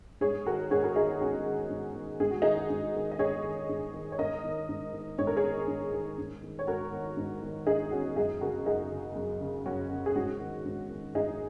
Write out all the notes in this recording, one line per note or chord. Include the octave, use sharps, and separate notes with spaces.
G#2 G#4 C#5
D#3 F#4 A#4
G#2 G#4 C#5
F#4 A#4
D#3 D#4 G#4
G#2 C#4 F#4
D#3
G#2
D#3
G#2 G#4
F#4
D#3 D#4 G#4
G#2
D#3
D#5
G#2 G#4 C#5
D#3
G#2
D#3
C#5
G#2 A#4 D#5
D#3
G#2
D#3
G#2 C#5
A#4
G#4 C#5
D#3
G#2
D#3
G#2
D#3
C#5
G#2 F#4 A#4
D#3
G#2
D#3
G#2 D#4 G#4
D#3 C#4 F#4
F#2 D#4 G#4
C#3 F#4 A#4
F#2 D#4 G#4
C#3
F#2
C#3
F#2 C#4 F#4
C#3
G#4
G#2 C#4 F#4
D#3
G#2
D#3
G#2 D#4 G#4